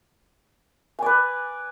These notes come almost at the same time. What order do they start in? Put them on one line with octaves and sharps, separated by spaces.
G#5 D5 B4